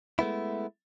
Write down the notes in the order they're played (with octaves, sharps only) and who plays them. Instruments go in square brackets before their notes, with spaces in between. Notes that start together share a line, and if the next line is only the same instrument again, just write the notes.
[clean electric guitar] G#3 A3 B3 E4